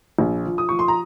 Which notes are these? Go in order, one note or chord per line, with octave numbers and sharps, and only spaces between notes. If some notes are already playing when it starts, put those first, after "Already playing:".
A#1
F3
D#6
F3 C#6
C6
A#5